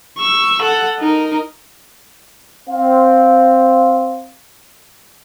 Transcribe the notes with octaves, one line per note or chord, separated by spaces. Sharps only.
C#6 E6
A4 F#5
D#4 A#4
C4 F5